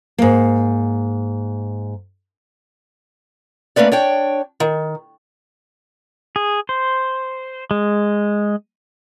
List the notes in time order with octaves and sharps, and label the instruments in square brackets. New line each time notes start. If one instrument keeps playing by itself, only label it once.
[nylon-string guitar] G#2 A#3
[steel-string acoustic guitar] A3 A#3 C#4 B4 D5
D4 C#5 G5
D#3
[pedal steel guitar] G#4
C5
G#3